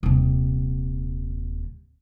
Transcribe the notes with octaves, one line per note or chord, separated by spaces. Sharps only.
D#1 C3